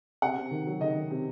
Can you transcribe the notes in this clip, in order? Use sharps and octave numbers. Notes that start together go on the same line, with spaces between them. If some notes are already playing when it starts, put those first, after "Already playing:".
C3 F#5
C3
D#3
F#3
D#3 D#5
D#3
C3